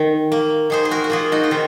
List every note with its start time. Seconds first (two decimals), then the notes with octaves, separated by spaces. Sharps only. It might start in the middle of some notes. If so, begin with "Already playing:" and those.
Already playing: D#3
0.32 A#3
0.70 D#3 G#4 C5
0.85 G#4
0.91 F#4 A#4
1.04 F#4
1.10 A#3 F4 G#4
1.32 D#4 F#4
1.43 F4
1.51 D#3 C4